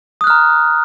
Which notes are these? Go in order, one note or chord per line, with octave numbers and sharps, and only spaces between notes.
A#5 D#6 F6 F#6